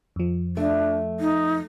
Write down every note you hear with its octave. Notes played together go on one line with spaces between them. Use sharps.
F2 F3
A3 D4
D#4